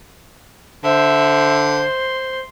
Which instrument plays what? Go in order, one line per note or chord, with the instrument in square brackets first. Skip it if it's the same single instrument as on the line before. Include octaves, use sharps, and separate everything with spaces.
[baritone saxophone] D3 [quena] C5 [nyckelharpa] E5
[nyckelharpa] C6